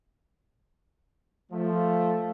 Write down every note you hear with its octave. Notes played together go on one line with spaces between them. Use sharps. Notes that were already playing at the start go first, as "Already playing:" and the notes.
F3 A3